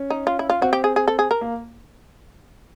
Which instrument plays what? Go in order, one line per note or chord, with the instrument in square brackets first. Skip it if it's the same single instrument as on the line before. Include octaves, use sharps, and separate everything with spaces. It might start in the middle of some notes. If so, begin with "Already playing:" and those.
Already playing: [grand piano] C#4
[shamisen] D#4
F4
E4
F4
[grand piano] C4 [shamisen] F#4
[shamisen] G4
G#4
G#4
A4
G#4
A#4
[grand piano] A#3